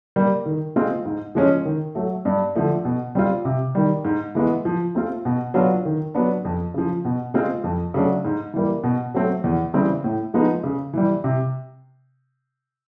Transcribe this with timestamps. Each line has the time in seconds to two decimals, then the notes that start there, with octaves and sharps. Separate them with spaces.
0.16 G3 A#3
0.46 D#3
0.76 G#3 C4 F4
1.05 G#2
1.35 F3 G#3 C#4
1.65 D#3
1.95 F#3 A3
2.25 G2
2.55 D3 F3 A3
2.85 B2
3.15 G3 C4 F4
3.45 C3
3.75 D#3 G3
4.05 G#2
4.35 E3 G#3 B3
4.65 F3
4.95 A3 C4 F4
5.25 B2
5.54 F#3 B3 D4 F4
5.85 D#3
6.14 F#3 B3 D4
6.45 F2
6.74 C#3 F3
7.05 B2
7.34 G#3 C4 F4
7.64 F2
7.94 C#3 F#3 A3 D4
8.25 G#2
8.54 E3 G3 A#3
8.84 B2
9.14 F#3 A3 C4
9.44 E2
9.74 C#3 E3 G3 C4
10.04 A2
10.34 F3 G#3 B3 D#4
10.64 C#3
10.93 E3 G3
11.24 C3